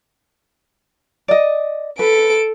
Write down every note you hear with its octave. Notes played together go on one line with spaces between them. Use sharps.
D5 D#5
A4 B4 D7